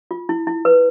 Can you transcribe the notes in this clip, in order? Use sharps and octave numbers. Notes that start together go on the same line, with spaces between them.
F4
E4
E4
B4